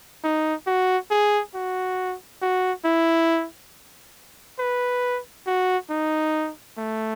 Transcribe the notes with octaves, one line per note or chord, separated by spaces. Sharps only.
D#4
F#4
G#4
F#4
F#4
E4
B4
F#4
D#4
A3